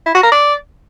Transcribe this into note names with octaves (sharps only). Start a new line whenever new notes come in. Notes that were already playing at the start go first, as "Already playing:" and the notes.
E4
F#4
A#4
D5